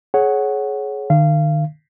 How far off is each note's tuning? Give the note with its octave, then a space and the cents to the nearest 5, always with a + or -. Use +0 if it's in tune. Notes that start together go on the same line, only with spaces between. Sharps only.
G#4 +25 C#5 -5 F#5 +5
D#3 -40 F5 -25